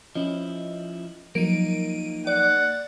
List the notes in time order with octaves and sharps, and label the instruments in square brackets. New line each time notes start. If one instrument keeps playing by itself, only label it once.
[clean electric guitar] F3 E4 [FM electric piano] C#4 D#5
[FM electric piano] F3 F#3 A#4 [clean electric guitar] A#3 D#4 [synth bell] D7 D#7
[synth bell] D5 [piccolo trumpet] F#5